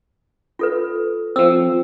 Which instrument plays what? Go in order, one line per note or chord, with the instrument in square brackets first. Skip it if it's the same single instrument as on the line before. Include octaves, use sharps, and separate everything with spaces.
[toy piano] F4 A4 B4
[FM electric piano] F3 C4 [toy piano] E6